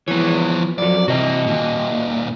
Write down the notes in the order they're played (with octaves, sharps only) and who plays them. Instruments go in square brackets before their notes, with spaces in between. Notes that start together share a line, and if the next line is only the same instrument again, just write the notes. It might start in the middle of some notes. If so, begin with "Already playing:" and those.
[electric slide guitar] E3 B3 [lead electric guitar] F3 C#5
[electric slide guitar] F2 F#3 [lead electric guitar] D5
[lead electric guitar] C3 E3 [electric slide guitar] F#4 D#5
[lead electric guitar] D#2 A#2